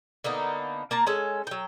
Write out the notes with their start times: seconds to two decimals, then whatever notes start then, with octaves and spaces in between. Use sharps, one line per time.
0.24 D3 A#3 B3 D#4
0.91 A#3 A5 A#5
1.07 G#3 C#4 A4
1.47 F#3 G5